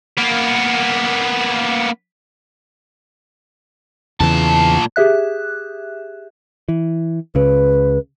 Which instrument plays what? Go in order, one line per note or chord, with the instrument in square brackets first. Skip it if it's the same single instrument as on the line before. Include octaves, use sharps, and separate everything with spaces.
[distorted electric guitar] A#3 B3
[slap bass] E2 C#3 E3 [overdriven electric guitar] A#2 A5
[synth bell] G4 G#4 E5 F#6
[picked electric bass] E3
[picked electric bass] C#2 C#3 [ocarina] B4